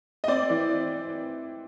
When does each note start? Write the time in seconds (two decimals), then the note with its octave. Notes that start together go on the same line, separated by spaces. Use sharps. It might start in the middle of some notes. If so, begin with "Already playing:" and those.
0.24 D#5
0.28 C4 D5
0.50 E3